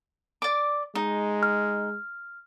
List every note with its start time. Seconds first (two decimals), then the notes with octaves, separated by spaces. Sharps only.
0.42 D5 D6
0.95 G#3 D#4
1.43 F6